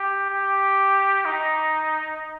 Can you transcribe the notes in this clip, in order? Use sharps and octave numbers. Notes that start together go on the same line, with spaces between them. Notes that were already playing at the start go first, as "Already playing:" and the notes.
Already playing: G4
G4
D#4